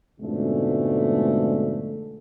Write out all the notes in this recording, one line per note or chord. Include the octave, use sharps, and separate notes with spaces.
F2 G#2 B2 D3 G#3 A3